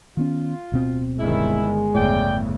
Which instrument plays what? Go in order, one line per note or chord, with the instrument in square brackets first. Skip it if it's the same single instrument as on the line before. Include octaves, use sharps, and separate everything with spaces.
[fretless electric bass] D#3 B3 C#4 [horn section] F4
[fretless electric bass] D1 B2 C4
[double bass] G1 D#3 [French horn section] G#3 [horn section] E4
[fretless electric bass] G1 A2 [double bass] E2 C#3 [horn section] D5 G5